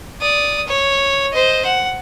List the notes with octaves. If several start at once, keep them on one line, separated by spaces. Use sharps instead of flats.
D5 D#6
C#5
C5 D#5
F#5